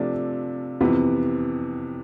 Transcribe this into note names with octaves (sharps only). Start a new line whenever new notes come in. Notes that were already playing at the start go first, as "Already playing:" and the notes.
Already playing: C3 F3 A3 D4 F4
F2 C3 E3 B3